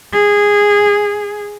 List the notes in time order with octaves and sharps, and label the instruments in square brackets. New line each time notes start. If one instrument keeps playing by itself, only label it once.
[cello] G#4